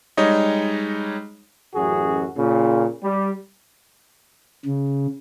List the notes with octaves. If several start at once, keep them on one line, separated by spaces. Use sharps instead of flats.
G3 G#3 D#4 C#5 D#5
A1 F#2 F#4 G#4
A#2 C#3
G3
C#3